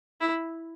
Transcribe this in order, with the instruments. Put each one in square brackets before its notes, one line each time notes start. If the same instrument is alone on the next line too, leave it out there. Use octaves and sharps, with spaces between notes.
[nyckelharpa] E4